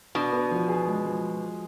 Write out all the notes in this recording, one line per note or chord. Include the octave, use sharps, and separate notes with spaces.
B2 D4
B3
F3
G#4
G#3
F3